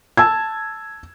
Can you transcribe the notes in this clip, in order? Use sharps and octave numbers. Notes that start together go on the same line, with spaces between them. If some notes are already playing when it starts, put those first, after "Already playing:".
A5 E6 G#6